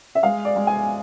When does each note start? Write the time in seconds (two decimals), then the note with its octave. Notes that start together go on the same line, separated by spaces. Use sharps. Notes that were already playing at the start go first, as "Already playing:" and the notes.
0.15 E5
0.23 G#3 F5
0.45 D5
0.56 G#3
0.67 G#5